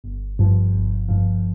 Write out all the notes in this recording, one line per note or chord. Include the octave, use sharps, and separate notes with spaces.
G1
G2 F3
G1
G2 F3